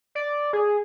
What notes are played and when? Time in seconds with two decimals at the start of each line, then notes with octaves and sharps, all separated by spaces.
0.15 D5
0.53 G#4